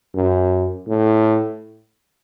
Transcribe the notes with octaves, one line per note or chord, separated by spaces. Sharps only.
F#2
A2